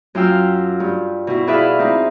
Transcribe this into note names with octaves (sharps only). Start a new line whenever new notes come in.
F#2 F4 F5 G5 E6
G2
B2 E4
E4 G#4 B4 D5 E5 F5
C4 D#4 E4